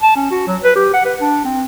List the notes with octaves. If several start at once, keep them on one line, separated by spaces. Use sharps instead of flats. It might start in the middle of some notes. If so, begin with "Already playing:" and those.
A5
C#4
F#4
F#3
B4
G4
F#5
B4
D4
C4